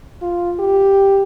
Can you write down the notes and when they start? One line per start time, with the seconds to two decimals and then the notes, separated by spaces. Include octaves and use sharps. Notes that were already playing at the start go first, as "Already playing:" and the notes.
0.22 F4
0.59 G4